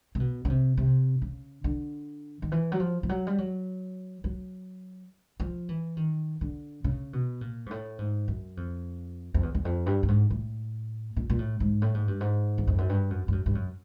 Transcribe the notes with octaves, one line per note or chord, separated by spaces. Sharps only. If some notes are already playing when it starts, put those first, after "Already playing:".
C3
B2
C#3
C3
C3
C#3
D3
D#3
E3
F#3
F3
F3
F#3
G3
F#3
F#3
F3
E3
D#3
D3
C#3
B2
A#2
G#2
A2
G#2
F#2
F2
F2
E2
E2
F2
G2
G2
G#2
A2
A#2
A#2
A2
G#2
A2
G#2
G2
G#2
E2
F2
F#2
G2
F#2
G2
F#2
G2
F#2